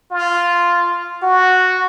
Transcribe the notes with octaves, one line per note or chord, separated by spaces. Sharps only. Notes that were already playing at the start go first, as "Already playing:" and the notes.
F4
F#4